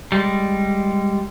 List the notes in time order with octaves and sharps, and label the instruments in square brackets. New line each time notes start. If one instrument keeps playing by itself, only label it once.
[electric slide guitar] G3 G#3